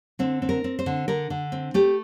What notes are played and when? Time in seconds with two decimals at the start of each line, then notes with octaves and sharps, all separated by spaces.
0.19 D3 C4
0.42 C4
0.49 A#4
0.64 C4
0.79 C5
0.86 D3
1.08 D3 A#4
1.30 D3
1.52 C4
1.74 A3 G4